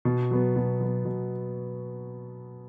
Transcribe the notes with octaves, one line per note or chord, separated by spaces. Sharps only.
B2
F#3 B3
B2
F#3 B3
B2